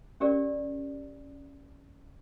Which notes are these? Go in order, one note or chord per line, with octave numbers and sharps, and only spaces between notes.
C#4 G4 A#4 D5